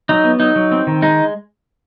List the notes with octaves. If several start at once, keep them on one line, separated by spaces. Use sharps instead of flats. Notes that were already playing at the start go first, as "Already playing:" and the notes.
F#3 D#4
B3
F#3 D#4
F#3
C4
D#3
G#3 D#4